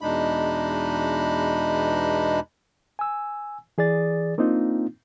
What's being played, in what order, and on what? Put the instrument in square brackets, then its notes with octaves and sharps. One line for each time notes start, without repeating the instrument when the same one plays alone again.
[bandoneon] E2 B2 G#3 D4 D#4 B5
[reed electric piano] G#5 E6
E3 G#4 D5 A6
A#3 C4 D4 D#4 F4